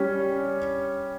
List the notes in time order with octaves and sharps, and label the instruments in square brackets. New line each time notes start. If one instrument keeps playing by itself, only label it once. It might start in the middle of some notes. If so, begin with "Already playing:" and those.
Already playing: [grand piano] G3 C#4